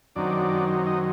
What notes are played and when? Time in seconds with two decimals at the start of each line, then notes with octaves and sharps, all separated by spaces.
0.16 F#2 D#3 F#3 C4 D4 D#4 D5
0.86 D#4 D#5